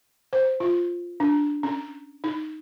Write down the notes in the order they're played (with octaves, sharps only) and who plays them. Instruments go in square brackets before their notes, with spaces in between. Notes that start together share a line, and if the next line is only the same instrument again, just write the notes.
[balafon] C5
F4
D4
C#4
D#4